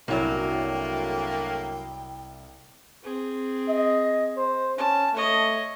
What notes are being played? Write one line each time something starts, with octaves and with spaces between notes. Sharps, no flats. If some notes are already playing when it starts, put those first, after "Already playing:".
C2 F#2 D3 F#3 A3 A#3 E4 G5
C4 G#4
D#5
C5
C#4 A5
A3 C#5 D#5